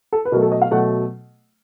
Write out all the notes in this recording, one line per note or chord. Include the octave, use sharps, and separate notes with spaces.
A4
B4
B2 F#3 A3 A#4
A4
D#5
F5
B2 F#3 A3 F#5